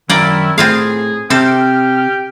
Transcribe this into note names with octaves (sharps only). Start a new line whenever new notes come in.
F#2 D#3 A#3 E4 D5
A2 C4 F4 G#4 F5
C3 C4 G4 A4 G5 F6